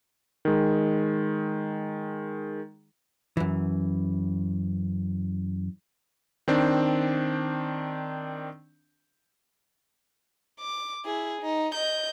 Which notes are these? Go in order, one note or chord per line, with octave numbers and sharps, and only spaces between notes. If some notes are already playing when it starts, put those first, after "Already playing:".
D#3 G#3
F#2 E3
D#3 C4 D4
D6
E4 G#4
D#4
D#5 G6